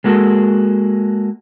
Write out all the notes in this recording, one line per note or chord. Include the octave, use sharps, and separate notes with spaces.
G#3 A#3 F#4 A4